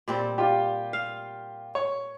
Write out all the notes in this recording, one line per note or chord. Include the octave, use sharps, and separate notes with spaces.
A#2 G3 C4
F4 G4
F5
C#5